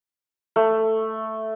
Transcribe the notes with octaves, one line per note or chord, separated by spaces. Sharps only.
A3